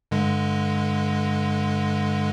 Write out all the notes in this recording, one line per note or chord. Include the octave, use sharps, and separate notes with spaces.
G2 D3 G#3